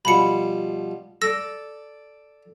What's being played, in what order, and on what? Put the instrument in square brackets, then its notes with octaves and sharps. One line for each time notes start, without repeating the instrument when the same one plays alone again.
[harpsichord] B2 F3 G3 [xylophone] B5 C#7
[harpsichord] A4 D5 [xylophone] E6 A#6